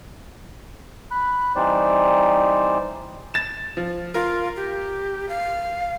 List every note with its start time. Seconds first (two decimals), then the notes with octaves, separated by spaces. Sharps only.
1.11 B5 F#6
1.56 E3 G3 C4 D#4 C5 D5
3.34 A6 E7
3.77 F3
4.14 F4 A#4
4.56 G4
5.29 F5